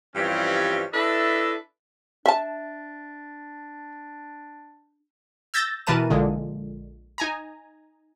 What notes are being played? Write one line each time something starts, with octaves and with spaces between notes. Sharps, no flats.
G2 E3 F3 G3 C4 C#4
D4 E4 A4 B4 D#5 E5
D4 E5 A5
E6 G6 A6 A#6
B2 E3 A#4 B4 A5 D#7
A#1 A#2 D3 G#3
D#4 G#5 A#5